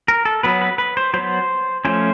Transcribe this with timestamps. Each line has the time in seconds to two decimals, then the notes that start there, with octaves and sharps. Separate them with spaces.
0.08 A#4
0.25 A4
0.43 F#3 B3 B4
0.62 B4
0.78 B4
0.97 C5
1.14 F#3 B3 C5
1.85 F3 A3 C#4 C5